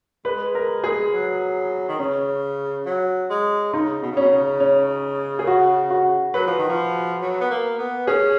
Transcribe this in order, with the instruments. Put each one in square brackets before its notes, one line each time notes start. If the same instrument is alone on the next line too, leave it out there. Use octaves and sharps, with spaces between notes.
[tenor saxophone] G#3 [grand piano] B4
[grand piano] A#4
G#4
[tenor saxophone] F#3
D#3
[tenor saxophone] C#3 [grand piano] C#4
[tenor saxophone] F#3
G#3
[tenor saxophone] C#3 [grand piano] D#4
[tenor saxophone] B2
C#3
[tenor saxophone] B2 [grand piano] C#4
[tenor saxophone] C#3
[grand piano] C#4
G#4
F#4
F#4
[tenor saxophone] F#3 [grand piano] B4
[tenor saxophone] F3
D#3
F3
F#3
B3
A#3
B3
[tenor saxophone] C#4 [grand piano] G#4